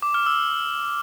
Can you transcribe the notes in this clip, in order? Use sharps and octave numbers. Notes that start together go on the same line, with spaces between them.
D6
F6
E6